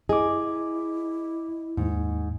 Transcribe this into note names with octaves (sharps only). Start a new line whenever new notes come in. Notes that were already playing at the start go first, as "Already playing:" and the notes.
E4 G#4 D#5 D6
D#2 G#2